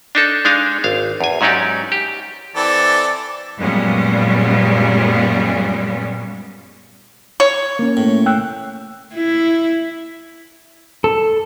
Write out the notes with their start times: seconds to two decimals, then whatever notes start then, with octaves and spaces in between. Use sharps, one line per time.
0.15 D4 D#4 A4
0.45 G#3 D4 D#4 F5
0.84 G#1 F5
1.21 E2 G#5
1.41 G#2 F#3 C#4 D#4 G4 D5
1.92 G4
2.56 E3 C4 A4 D5
3.60 F#2 A#2 G3 G#3 B3 C#4
7.40 C#5
7.79 A#3 C#4
7.97 A2
8.26 G5 E6 F#6
9.15 E4
11.04 A4